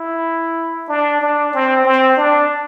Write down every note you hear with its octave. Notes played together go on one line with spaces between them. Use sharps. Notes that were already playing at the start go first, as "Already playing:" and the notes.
Already playing: E4
D4
D4
C4
C4
D4